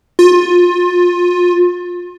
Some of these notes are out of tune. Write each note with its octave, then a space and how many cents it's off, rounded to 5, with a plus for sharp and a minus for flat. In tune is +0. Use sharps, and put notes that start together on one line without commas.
F4 +25